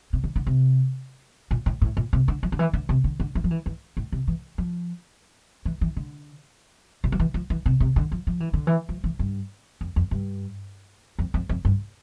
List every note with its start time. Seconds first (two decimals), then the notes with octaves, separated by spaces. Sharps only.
0.13 C3
0.24 D3
0.36 D3
0.47 C3
1.51 A#2
1.66 A2
1.81 A2
1.97 A#2
2.13 C3
2.28 D3
2.43 F3
2.52 D3
2.59 E3
2.73 D3
2.89 C3
3.04 D3
3.20 D3
3.35 E3
3.44 F3
3.51 E3
3.66 E3
3.97 A2
4.12 C3
4.28 E3
4.58 F3
5.65 E3
5.81 E3
5.96 D3
7.04 A#2
7.12 F3
7.20 E3
7.34 F3
7.50 E3
7.66 C3
7.80 C3
7.96 D3
8.12 F3
8.27 F3
8.40 E3
8.54 D3
8.67 E3
8.89 F3
9.04 E3
9.19 G2
9.81 F2
9.96 F2
10.11 G2
11.19 F2
11.34 F2
11.49 F2
11.65 G2